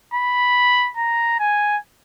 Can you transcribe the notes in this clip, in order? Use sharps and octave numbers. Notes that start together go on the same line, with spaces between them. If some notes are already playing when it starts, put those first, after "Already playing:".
B5
A#5
G#5